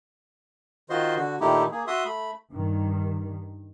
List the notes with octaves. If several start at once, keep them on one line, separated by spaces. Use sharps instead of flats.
D#3 F4 F#4 C5 D#5 C6
D3 F#4
A#2 D#3 A3 D#4 E4 G4
A#3 G#4
F#4 E5 C6 D#6
A3 B5
G2 D#3